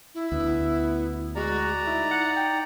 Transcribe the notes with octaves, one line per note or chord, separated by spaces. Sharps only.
E4
D2 B3
G#3 F#4 D5 A#5
D#4 E4
F#5
G5